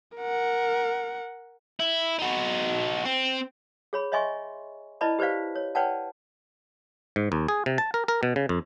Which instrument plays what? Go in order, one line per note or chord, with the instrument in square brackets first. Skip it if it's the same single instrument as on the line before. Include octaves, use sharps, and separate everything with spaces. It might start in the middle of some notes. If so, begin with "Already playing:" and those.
[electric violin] A#4 F#5
[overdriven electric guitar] E4
D#4 F#4
C4
[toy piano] G#4 C#5 B5
C#5 D#5 E5 G#5 C6 C#6
E4 B4 D5 D#5 A5 B5
G4 B4 C5 D5 F5
C#5
B4 C#5 D5 F#5 G5 A5
[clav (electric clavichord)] G#2
D#2
G#4
C3
A5
A#4
A#4
B2
C#3
F2